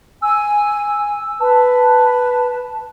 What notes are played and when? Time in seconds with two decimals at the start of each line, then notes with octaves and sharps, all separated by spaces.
0.22 G#5 E6
1.41 B4 A5